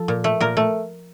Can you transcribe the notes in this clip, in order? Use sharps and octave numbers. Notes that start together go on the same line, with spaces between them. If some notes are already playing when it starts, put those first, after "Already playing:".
Already playing: F3 A4
A#2
A3
A#2 A#4
A3